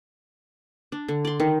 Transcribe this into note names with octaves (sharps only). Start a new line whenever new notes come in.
D4
D3
D5 C6
D#3